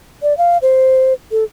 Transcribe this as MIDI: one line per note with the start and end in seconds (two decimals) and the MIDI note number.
0.23 0.36 74
0.38 0.58 77
0.62 1.13 72
1.32 1.44 69